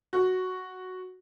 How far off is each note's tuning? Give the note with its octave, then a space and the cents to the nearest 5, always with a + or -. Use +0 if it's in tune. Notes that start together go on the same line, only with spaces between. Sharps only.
F#4 +0